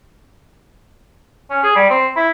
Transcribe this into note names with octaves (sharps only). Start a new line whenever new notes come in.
C#4
G#4
G3
C4
E4